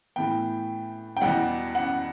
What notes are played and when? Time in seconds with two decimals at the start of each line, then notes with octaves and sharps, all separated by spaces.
0.16 A2 E3 B3 G5
1.17 G5
1.21 E2 B2 G3 F#5
1.75 F#5